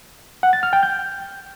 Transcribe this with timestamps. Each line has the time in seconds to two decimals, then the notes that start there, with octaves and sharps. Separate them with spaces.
0.43 F#5
0.53 A6
0.63 F6
0.73 G5
0.83 G6